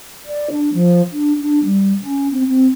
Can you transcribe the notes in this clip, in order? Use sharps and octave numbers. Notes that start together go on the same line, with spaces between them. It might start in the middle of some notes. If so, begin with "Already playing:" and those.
D5
D4
F3
D4
D4
G3
C#4
C4
C4